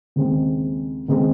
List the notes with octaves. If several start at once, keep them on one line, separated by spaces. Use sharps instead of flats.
D#2 C#3 G#3 C4
D#2 C#3 G#3 C4